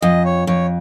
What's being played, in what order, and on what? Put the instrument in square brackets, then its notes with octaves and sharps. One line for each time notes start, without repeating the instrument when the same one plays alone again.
[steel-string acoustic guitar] F2 [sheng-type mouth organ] D#5
[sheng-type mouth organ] C#5
[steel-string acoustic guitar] F2 [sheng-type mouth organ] C#5